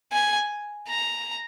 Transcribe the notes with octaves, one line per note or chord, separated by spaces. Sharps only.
G#5
A#5